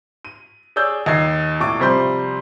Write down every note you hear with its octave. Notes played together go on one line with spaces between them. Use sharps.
D#7
G#4 C#5 D5 E6 G6
D#2 D#5 G#6 C7
E1 A2 C#6 D6
C3 F3 G3 C5 C6 G6